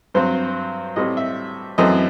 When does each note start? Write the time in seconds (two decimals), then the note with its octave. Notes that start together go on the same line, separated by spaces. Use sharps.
0.14 G2 F#3 C4 C5
0.96 A2 G3 C4 D#5
1.17 E5
1.78 F#2 E3 A3 C4 D#5